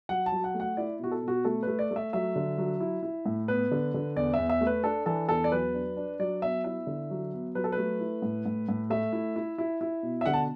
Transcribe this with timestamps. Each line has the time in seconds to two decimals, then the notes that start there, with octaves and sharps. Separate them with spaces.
0.09 F#3 F#5
0.26 A5
0.32 F#3
0.44 F#5
0.54 A3
0.60 F#5
0.77 E4 D5
0.99 B2 F#4
1.11 A4
1.23 B2 F#4
1.45 A3 A4
1.63 A3 B4
1.79 D5
1.91 A3
1.96 E5
2.13 F#3 E5
2.36 D3
2.58 F#3
2.81 E4
3.03 E4
3.26 A2
3.48 B3 B4
3.71 D3
3.94 D3
4.16 E2 D5
4.34 E2 E5
4.50 E5
4.61 A3
4.67 B4
4.84 D4 A4
5.06 E3 A4
5.29 E2 A4
5.44 D5
5.52 F#3 B4
5.74 D4
5.97 D4
6.19 F#3 D5
6.42 B3 E5
6.64 E4 E5
6.87 D3
7.10 F#3
7.33 B3
7.55 F#3 B4
7.64 A4
7.72 B4
7.78 A3
8.00 E4
8.22 A2
8.46 A2
8.69 A2
8.90 A3 E5
9.13 E4
9.36 E4
9.58 E4
9.81 E4
10.03 B2
10.21 E5
10.26 D3 F#5
10.33 A5